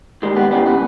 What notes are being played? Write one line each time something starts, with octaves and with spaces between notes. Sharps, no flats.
D#2 D#3 G3 G#3
B3
D#2 C#3 E3 G3 B3
B3